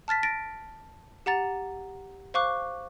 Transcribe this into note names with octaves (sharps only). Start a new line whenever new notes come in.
A5 F6 A6 B6
A6 A#6 D7
G4 F#5 A#5 A6
C5 F5 C#6 D6 F#6